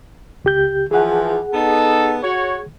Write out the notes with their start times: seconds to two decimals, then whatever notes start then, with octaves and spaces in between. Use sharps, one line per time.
0.45 C#2 G4 G6
0.91 E3 F3 G#4 F#5
1.53 B3 D#4 A4
2.23 F#4 C#5